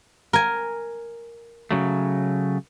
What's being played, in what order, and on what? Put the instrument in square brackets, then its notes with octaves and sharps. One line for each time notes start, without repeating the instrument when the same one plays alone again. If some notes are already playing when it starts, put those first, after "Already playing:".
[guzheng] A#4 G#5
[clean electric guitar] C#3 F#3 A3